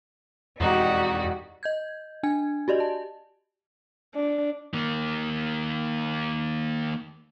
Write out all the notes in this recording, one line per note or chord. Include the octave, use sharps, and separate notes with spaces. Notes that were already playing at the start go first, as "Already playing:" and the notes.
E1 F2 D#4 F#4 G4 D5 D#5 A#5
D#5 G6 G#6
D4 G#5 G#6
F#4 G4 D5 D#5
A5
D4
D#3 A#3